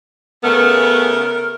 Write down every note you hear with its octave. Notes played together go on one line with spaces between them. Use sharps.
C#3 A3 B3 A#4